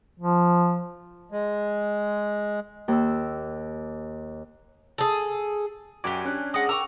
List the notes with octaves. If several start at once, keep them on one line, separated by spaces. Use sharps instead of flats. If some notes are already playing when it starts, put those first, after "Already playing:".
F3
G#3
D#2 E6
G#4 A4
F#2 F#4 G4 D5 G#5 D6
C#4 D4 F#6
G#3 F#5 D6 D#6 A#6
A#4 G5 G#5 A#5 C#6 D6 E6 F7